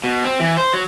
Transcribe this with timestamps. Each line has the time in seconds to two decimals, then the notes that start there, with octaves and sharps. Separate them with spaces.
0.04 B2
0.24 C4
0.40 E3
0.57 C5
0.74 F#3